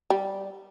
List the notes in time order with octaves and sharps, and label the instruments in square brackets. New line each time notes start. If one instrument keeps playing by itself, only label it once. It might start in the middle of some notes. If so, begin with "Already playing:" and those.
[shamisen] G3